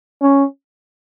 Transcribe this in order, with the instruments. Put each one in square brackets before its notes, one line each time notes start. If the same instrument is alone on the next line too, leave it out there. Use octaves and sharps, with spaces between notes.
[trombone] C#4